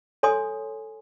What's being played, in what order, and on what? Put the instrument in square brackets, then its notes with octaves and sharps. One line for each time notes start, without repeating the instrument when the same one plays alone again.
[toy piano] A4 C#5 G#5 C6 D#6